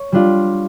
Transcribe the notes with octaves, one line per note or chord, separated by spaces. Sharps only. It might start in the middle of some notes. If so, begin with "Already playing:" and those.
Already playing: C#5
G3 D4 F4